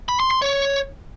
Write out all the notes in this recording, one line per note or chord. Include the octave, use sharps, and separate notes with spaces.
B5
C6
C6
C#5